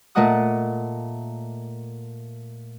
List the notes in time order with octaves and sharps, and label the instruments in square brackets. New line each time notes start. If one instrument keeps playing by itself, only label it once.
[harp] A#2 A3 A#3 D#5 F#5 D#6